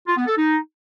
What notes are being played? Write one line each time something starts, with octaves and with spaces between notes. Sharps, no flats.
F4
B3
A4
D#4